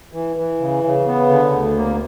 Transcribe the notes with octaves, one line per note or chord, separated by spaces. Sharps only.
E3
E3
C#3
C#3
B3
D3
D2
A#3